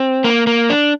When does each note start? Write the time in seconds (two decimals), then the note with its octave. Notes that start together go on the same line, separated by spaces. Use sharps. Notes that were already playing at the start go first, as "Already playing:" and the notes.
Already playing: C4
0.24 A#3
0.47 A#3
0.70 D4